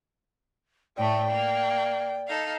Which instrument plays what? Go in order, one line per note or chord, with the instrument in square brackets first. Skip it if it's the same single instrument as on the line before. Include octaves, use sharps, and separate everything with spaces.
[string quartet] A2 A3 [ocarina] D5 [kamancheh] G5
[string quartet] A#3
D#4 A4 F5